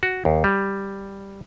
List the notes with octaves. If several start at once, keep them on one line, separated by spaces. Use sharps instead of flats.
F#4
D#2
G3